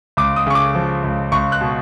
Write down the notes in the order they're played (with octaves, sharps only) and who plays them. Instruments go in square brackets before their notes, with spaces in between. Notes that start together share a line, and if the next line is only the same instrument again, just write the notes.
[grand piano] C#2 D6
D#6
C#3 C#6
D6
F3
C#2
C#2 C#6
F#6
B2